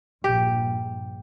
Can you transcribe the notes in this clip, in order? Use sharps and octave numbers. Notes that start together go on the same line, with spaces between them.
A#1 G2 G4